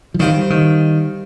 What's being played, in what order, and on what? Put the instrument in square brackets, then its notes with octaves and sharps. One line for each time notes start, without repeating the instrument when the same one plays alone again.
[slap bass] F3
[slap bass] D#3 [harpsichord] G3 C4 F4 C5
[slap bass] D#3